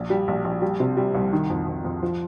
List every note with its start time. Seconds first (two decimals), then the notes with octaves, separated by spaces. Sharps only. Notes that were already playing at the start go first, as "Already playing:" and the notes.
Already playing: A#1
0.10 G3
0.28 A#1
0.45 A#1
0.62 G3
0.80 C3
0.97 G3
1.15 C2
1.33 D#3
1.50 F2
1.67 F2
1.84 F2
2.03 F3